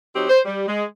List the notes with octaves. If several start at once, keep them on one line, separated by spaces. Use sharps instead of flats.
F#3 C4 D#4 G4
C5
G3
G#3